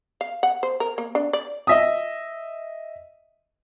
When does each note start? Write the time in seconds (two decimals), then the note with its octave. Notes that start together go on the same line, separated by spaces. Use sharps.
0.21 F5
0.43 F#5
0.63 C5
0.80 A#4
0.98 A#3
1.15 D4
1.33 D5
1.67 D#5 E5 D#6